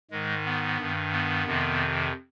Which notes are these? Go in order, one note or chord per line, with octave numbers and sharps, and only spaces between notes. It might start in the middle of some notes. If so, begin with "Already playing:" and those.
G#2 D#3 G#3
B3
G2 D#3
B3
F2 C3 D#3